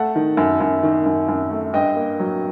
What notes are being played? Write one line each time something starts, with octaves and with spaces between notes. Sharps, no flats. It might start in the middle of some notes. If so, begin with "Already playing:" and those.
Already playing: A3 F#5 A5
D#3
F#2
F#2
D#3
F#2
F#2
A3
G2 D#5 G5
A#3
F#3